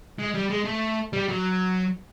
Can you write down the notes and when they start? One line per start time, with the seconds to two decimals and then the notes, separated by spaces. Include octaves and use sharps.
0.19 G#3
0.34 G3
0.50 G#3
0.65 A3
1.13 G3
1.29 F#3